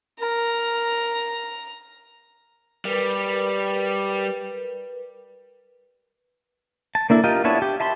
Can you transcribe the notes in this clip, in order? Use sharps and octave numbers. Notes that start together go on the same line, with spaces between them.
A#4 A#5
G3 A#4 B4
A5
A#3 D4 E4 A4
F4 G4 A#4 D#5
B3 D4 E4 C#5 A5
G4
E5 A5 B5 C6